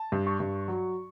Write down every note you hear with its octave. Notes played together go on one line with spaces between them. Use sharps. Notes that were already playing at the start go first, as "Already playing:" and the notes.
Already playing: A5
G2
C#6
G2
F#3